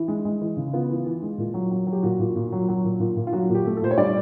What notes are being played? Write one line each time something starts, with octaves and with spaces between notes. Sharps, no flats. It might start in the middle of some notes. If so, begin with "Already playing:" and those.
Already playing: E3 E4
G#3
G#3
E3
C#3
B3 F4
E3
E3
G#3
A#2
F#3
F#3
F#3
G4
A#2 F#4
A#2
A#2
F#3
F#3
A#2
A#2
A#2
F4
F#3 F#4
A#2
G4
A3
A4
A#2 C5
C#5
G3 D5